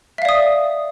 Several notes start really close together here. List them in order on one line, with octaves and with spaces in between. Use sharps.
E5 F5 D5 D#6